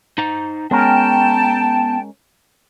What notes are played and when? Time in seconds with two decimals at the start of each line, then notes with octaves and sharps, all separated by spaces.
0.18 D#4 C5 A#5
0.71 G#3 B3 C#4 A#4 G5 A5